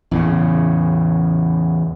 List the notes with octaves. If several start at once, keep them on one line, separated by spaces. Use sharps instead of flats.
E2 A2 C#3